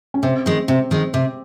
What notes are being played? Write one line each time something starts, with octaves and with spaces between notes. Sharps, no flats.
C#4
C3 C4
D#3 G#3
C3 C4
D#3 G#3
C3